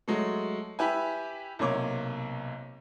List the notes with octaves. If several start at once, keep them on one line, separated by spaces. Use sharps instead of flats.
F#3 G#3 A3
E4 G4 B4 E5 G#5
B1 C3 A#3 C#5 D6